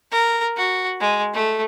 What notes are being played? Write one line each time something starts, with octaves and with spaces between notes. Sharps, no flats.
A#4
F#4
G#3
A3